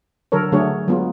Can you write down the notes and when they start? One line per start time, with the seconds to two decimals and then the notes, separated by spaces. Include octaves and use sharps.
0.32 D3 F#3 A4 A#4 C#5
0.52 D3 F#3 A3 D4 G#4 C#5
0.88 F#3 G#3 B3 F4